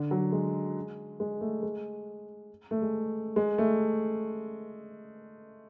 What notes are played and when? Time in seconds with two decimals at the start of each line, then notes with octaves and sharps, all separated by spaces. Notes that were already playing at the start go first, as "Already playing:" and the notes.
Already playing: D3
0.11 F#3
0.32 G#3
1.20 G#3
1.41 A3
1.62 G#3
2.71 A3
2.82 G#3
3.36 G#3
3.58 A3